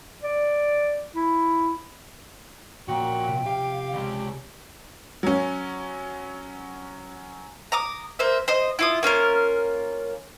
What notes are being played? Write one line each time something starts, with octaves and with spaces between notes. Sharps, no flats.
D5
E4
A#2 F3 C#4 F#4 C#5 G5
C3 B6
G4 F5
C#2 G#3 D5 B5 C#6
F#3 C#4
A#5 D6 D#6
A#3 C5 E5
C5 D#5
E4 F4 D#6
A#3 C#4 F4 A#4